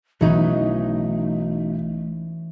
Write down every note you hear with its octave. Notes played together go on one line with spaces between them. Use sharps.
B1 E3 F#3 A3 C#4 D#4